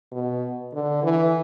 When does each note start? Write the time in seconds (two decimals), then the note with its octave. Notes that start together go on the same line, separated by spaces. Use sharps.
0.12 B2
0.73 D3
1.03 E3